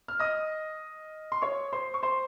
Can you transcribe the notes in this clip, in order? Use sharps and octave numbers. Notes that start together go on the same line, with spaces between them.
F6
D#5 D#6
C6
C#5 C#6
C5 C6
C#6
C5 C6